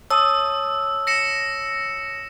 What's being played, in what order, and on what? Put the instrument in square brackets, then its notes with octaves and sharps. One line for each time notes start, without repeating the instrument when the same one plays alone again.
[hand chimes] C#5 A5 D#6 [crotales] E6
[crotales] A#6 C#7 E7